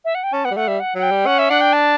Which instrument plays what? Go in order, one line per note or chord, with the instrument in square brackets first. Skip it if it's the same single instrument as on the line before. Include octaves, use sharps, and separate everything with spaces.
[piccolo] E5
F#5
G5
[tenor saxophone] C#4 [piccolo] A5
[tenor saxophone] B3 [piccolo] F#5
[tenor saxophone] G3
[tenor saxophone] A3 [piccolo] F#5
[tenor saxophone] G3 [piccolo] E5
[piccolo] F#5
[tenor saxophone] F#3 [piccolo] F#5
[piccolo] G5
[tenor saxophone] G3
[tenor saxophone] C#4 [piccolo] F#5
[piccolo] E5
[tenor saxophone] D4 [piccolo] F#5
[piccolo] G5
A5